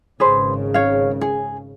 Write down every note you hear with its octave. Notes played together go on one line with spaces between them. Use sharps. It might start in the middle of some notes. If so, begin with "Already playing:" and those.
G#1 C#3 G#4 B4 C5
C#5 F5
G#4